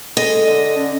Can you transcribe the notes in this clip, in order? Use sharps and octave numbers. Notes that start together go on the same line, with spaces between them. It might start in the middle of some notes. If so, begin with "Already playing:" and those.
G#3 A4 D#5
D3
D3 C#4